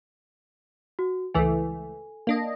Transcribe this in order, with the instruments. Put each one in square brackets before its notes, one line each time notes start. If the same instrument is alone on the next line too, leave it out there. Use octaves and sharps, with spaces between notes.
[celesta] F#4
[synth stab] C#2 E3 A3 [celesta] A4 G#5
[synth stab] A#3 D4 D#5